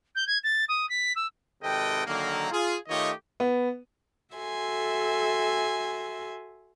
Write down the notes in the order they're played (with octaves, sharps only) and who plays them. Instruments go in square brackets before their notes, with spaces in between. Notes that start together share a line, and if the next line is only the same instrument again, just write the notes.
[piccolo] G6
G#6
A6
D#6
B6
E6
[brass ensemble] G#1 C3 A4 B4 D#5 G5
D3 D#3 F#3 A#3
F4 G#4
D#3 A3 F4 G4 C#5 D#5
[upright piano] B3
[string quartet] F#4 A4 E5 G#5 C6